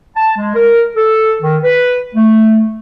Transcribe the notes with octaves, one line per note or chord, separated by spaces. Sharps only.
A5
G#3
A#4
A4
D#3
B4
A3